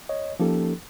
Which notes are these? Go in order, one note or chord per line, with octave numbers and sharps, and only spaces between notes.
C#5 D#5
F3 A#3 C#4 D#4 G4 A4